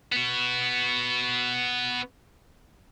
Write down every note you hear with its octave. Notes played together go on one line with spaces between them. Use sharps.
B3 F#4